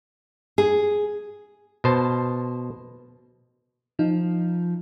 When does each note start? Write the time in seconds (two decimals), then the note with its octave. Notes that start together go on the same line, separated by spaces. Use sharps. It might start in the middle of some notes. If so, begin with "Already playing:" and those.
0.58 G#4
1.84 B2 C5 A5
3.99 F3 D#4